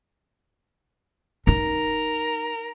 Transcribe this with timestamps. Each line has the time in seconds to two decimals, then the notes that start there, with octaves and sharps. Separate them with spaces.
1.47 D#4 A#4